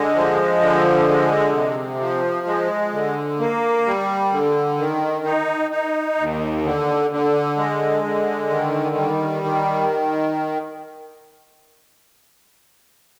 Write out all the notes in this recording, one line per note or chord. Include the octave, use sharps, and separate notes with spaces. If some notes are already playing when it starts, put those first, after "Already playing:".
Already playing: D3 G#3
F3
D3
G#3
C3
F3
G#3
D3
A#3
G3
D3
D#3
D#4
D#4
D#2
D3
D3
G#3
D3
D#3
G3
D#3